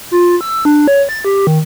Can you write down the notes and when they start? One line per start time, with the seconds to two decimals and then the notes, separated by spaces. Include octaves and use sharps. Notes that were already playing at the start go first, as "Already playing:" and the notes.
0.11 F4
0.41 E6
0.65 D4
0.88 C#5
1.09 A6
1.25 G4
1.47 D#3